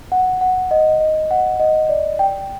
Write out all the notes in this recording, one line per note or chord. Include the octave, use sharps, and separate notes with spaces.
F#5
F#5
D#5
D#5
F#5
D#5
D5
G5